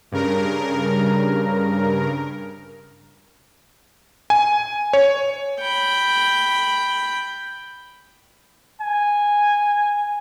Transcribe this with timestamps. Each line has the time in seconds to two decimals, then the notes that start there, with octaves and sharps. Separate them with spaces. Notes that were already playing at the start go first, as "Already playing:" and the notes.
0.12 G2 C#3 A#4
4.30 G#5
4.93 C#5
5.60 G5 B5
8.81 G#5